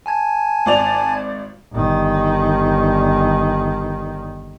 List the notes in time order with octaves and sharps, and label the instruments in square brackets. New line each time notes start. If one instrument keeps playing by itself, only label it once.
[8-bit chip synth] G#5 A5 G#6
[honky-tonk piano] G#1 D5 F7
[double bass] G1 D#3